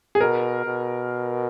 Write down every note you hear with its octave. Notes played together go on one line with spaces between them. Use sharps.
G#4
B2 A#4
B2